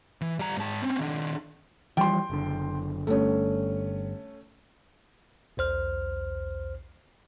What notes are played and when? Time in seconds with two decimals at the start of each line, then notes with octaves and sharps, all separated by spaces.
0.21 E3
0.39 G3 A#5
0.57 G#2 A5
0.82 C4 C#4
0.99 D#3 D4
1.97 E3 F3 G3 G5 C6
2.30 F#1 D3
3.07 G1 G2 A3 C#4
5.57 B1 E2 C5 F6